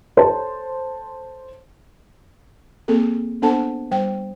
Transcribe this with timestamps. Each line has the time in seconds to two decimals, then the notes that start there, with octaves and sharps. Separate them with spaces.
0.17 A4 C5 C#5 A5
2.88 A#3 C4 G#4 A4
3.42 B3 D4 A4 C5 F#5 A5
3.91 G3 C5 G5